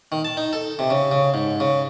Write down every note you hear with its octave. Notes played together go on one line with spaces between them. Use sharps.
D#3
A5
D#4
A4
C3
C#3
C#3
G#2
C#3